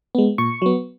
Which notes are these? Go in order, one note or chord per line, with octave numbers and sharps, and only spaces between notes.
G#3 B3
A#2 C#6
F#3 B3